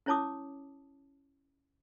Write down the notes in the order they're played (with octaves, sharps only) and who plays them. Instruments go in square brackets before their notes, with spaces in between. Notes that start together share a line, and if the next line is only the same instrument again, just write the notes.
[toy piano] C#4 E4 C#5 A5 D6 D#6